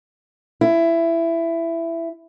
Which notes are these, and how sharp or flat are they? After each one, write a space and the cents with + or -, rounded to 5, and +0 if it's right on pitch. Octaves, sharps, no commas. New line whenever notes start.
E4 +15